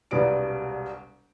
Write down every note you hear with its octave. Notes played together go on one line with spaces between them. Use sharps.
E1 C2 G3 B4 D5 D7